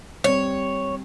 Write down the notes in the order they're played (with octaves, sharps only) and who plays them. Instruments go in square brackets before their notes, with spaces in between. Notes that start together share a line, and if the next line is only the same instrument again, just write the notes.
[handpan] G3 C4 [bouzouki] C#5